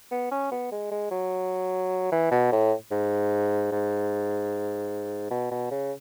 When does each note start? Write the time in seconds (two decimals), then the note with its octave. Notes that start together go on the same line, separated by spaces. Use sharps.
0.11 B3
0.31 C#4
0.51 B3
0.72 G#3
0.91 G#3
1.11 F#3
2.12 E3
2.31 B2
2.52 A2
2.91 G#2
3.72 G#2
5.30 B2
5.51 B2
5.71 C#3